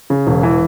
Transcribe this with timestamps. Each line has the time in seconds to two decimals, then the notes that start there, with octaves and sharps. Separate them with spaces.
0.10 C#3
0.27 E1
0.43 E3